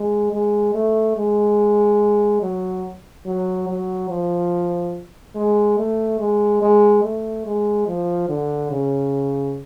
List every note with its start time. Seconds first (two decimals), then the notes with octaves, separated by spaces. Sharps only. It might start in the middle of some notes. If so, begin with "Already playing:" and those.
Already playing: G#3
0.33 G#3
0.75 A3
1.17 G#3
2.43 F#3
3.26 F#3
3.68 F#3
4.10 F3
5.36 G#3
5.79 A3
6.20 G#3
6.62 G#3
7.04 A3
7.46 G#3
7.88 F3
8.29 D3
8.71 C#3